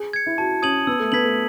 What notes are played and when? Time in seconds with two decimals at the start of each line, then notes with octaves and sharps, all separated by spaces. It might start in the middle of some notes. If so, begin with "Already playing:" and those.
Already playing: G#4
0.13 G#6 C#7
0.26 E4
0.38 F#4 A5
0.62 C#4 D#6 G#6 D#7 F#7
0.87 B3 E6
1.00 A3
1.12 B3 G#6 B6 F#7
1.24 A3